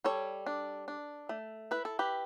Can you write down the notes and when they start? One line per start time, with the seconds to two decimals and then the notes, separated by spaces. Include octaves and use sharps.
0.04 G3 A4 C#5
0.46 D4
0.88 D4
1.29 A3
1.71 E4 B4
1.85 A4
1.99 G4 B4